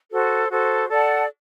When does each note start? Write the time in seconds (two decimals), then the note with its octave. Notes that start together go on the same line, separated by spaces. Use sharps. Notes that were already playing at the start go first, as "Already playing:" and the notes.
0.10 F#4 A4 C5
0.50 F#4 A4 C5
0.88 A4 D5 F#5 A5